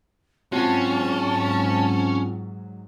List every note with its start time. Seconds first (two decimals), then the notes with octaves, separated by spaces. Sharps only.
0.52 G#2 F#3 C4 C#4 F4 F#4 A5